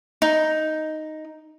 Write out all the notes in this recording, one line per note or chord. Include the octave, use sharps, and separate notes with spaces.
D#4